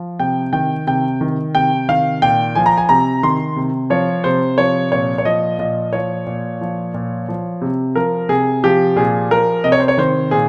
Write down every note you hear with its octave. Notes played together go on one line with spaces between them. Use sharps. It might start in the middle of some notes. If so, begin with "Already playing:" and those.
Already playing: F3
C3 G5
D#3 G5
C3 G5
D#3
C3 G5
D#3 F5
A#2 G5
F3 G#5
A#5
G#5
C3 A#5
D#3 C6
C3
F3 C#5
C3 C5
F3 C#5
A#2 C#5
C#5
F3 D#5
A#2 D#5
F3 C#5
A#2
F3
A#2
F3
C3
F3 A#4
C3 G#4
F3 G4
A#2 G#4
F3 A#4
C3 D#5
C#5
C5
C#5
D#3 C5
A#2 G#4